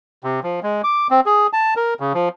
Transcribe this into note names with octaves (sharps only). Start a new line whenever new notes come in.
C3
F3
G#3
D6
C4
G#4
A5
A#4
C#3
F3